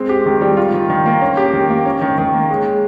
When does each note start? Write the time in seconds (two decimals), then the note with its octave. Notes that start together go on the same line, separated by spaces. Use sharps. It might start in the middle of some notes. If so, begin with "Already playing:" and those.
Already playing: G#3 C4
0.09 G4
0.26 D#3
0.41 G3
0.57 F4
0.74 D#3
0.90 D#3
1.06 A#3
1.21 C#4
1.37 G4
1.53 D#3
1.70 A#3
1.86 C#4
2.01 D#3
2.18 D#3
2.33 A#3
2.49 G#3